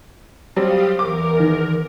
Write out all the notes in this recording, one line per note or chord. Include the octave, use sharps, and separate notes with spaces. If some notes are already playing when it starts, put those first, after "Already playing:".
F#3 G3 C4 G4 F5 D#6
E2 A#4 D6
D#3 E3